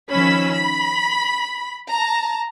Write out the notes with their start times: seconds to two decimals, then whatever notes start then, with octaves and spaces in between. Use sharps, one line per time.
0.11 D#3 F3 C#4 B5 E6 B6
0.51 B5 B6
1.88 A5 A#5